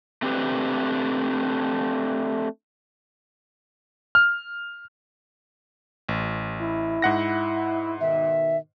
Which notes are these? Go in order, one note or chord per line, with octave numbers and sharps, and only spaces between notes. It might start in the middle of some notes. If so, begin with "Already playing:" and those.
A3 C4 D4 G4 A4 B4
F6
A1
E4
G#2 F#5 A#6
B2 D#3 E5